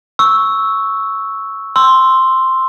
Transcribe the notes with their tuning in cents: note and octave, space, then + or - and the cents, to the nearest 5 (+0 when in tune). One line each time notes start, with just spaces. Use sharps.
C#6 +0 E6 -5
C6 +0 E6 +0